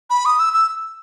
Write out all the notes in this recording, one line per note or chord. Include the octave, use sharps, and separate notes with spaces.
B5
D#6
E6
E6